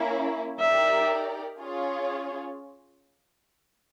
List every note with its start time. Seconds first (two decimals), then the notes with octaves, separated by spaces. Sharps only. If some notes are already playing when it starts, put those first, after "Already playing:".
Already playing: A#3 C#4 E4
0.60 D#4 G4 A#4 D5 E5
1.58 C#4 F4 G#4 C#5